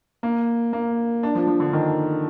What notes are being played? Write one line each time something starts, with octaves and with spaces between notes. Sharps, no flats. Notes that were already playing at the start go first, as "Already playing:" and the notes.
A#3
A#3
D4
F3
F3
D3
D#3